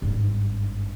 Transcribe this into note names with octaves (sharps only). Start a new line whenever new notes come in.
G#1 G2